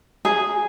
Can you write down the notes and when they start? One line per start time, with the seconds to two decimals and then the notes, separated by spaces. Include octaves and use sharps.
0.25 G#4